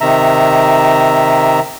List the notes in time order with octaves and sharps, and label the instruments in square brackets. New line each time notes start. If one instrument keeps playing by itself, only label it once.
[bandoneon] C3 D#3 E5 A#5